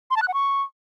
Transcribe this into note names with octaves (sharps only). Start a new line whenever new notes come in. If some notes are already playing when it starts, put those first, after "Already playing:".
C6
A5
F#6
F#5
C#6